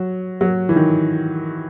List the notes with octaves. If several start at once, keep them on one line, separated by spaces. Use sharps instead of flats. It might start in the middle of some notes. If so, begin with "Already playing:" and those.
Already playing: F#3
F#3
E3
D#3